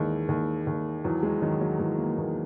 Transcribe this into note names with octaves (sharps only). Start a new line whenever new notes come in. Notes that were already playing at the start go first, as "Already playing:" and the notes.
Already playing: D#2 E3 G#3
D#2
D#2
E2 F#3
G#3
D#3 F#3
F#3
E2 G#3
A#3
E2 A#3